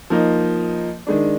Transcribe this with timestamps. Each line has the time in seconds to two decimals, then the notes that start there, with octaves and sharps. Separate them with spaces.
0.10 F3 A#3 D#4
1.07 D#3 G#3 D4